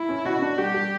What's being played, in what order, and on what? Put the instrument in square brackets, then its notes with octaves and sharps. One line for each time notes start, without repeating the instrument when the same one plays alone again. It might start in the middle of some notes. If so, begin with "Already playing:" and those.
Already playing: [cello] E4
[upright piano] C#4
[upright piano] B2 [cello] F#4
[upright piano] D4
[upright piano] G3 [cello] G4
[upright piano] G3